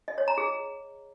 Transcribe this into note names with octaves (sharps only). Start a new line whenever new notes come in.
D#5
C#5
A#5
G#4